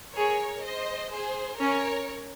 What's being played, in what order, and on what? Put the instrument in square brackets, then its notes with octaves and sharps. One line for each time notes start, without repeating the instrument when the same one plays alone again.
[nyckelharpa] G#4 [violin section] A#4 C#5
[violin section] C5 D#5
G#4 C5
[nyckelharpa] C#4 [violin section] A#4 C#5